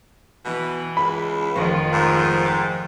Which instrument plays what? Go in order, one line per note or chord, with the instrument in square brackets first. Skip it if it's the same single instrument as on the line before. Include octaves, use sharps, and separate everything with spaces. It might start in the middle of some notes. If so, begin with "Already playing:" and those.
[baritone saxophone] B2 [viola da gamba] E3
[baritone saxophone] C#2 [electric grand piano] B5
[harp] F1 C5 C#6 [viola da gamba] D#3 F3 F4
[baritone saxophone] G#2
[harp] G5 F#6 A6